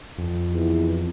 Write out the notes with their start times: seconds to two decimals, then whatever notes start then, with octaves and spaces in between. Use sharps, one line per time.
0.18 F2
0.53 E2